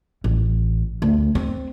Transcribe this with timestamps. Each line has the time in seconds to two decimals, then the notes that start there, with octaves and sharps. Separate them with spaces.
0.24 A1
1.02 D2
1.35 C4